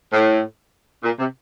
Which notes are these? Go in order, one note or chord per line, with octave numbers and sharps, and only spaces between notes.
A2
A#2
C3